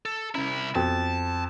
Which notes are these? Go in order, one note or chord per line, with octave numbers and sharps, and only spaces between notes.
A4
C2 C#4 E4
F2 B3 F#4 A4 A5